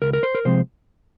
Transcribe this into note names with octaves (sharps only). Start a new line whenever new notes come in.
C#2 A#4
A#4
C5
A#4
C3 F3 G#3 C4 C5